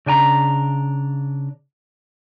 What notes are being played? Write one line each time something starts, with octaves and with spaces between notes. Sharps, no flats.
C#3 D4 G#5 A#5